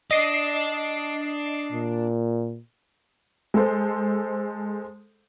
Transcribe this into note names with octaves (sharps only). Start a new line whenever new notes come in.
D4 D5 D#5 C7
A#2
G#3 A4 C5